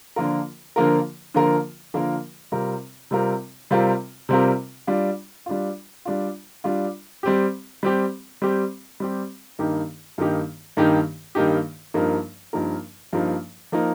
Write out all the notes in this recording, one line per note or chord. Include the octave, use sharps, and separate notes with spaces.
D3 F3 A#3 F4 A#4
D3 F3 A#3 F4 A#4
D3 F3 A#3 F4 A#4
D3 F3 A#3 F4 A#4
C3 G3 C4 F4 A#4
C3 G3 C4 F4 A#4
C3 G3 C4 F4 A#4
C3 G3 C4 F4 A#4
G3 D4 F4
G3 D4 F4
G3 D4 F4
G3 D4 F4
G3 C4 G4
G3 C4 G4
G3 C4 G4
G3 C4 G4
G2 D#3 A#3 D#4 G4
G2 D#3 A#3 D#4 G4
G2 D#3 A#3 D#4 G4
G2 D#3 A#3 D#4 G4
G2 F3 A#3 D#4 A#4
G2 F3 A#3 D#4 A#4
G2 F3 A#3 D#4 A#4
F3 A#3 D#4 A#4